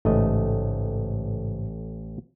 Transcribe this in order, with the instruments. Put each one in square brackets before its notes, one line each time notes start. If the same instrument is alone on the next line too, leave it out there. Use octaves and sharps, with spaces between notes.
[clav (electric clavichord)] A1 A3 D#5 [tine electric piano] G#2 C#3 C5